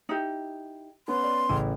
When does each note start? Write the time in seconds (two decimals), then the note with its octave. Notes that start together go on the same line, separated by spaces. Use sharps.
0.09 D#4 E4 G4
1.08 B3 C#4 C6
1.23 D5
1.49 A1 C#3 E4